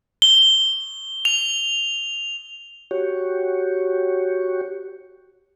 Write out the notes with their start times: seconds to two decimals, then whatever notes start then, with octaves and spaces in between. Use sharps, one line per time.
0.22 G7
1.25 F7
2.91 F#4 G4 C#5